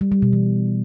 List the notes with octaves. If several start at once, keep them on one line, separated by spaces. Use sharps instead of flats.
G3
G3
B2
E3